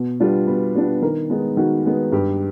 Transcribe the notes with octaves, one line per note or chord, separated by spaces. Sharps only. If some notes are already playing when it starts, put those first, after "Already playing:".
Already playing: B2
G3 B3 D4 F4
B2 B4
G3 B3 D4 F4
D#3 A#4
G#3 B3 D#4
D#3 F#4
G#3 B3 D#4
G2 G4